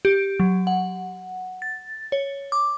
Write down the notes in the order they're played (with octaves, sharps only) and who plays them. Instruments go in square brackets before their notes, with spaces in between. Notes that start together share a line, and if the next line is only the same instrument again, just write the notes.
[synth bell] G4
F#3
F#5
A6
C#5
D6